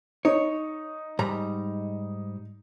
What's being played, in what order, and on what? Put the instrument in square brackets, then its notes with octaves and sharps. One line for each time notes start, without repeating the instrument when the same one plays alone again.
[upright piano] D#4 [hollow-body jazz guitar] C#5
[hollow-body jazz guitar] G#2 G3 A#5